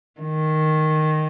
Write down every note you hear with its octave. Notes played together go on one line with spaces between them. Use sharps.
D#3